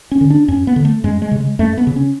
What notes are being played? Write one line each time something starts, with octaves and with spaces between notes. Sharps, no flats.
C#4
D3
D4
F#2 C#4
B3
D3
A3
F#2 G#3
G#3
C#3
G#3
F#2 A3
B3
C#3
C#4